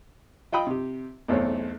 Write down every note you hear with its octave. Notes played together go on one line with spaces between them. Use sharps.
F4 D#5 G5 B5 D#6
C3 G4
B1 E2 A3 C4 C#5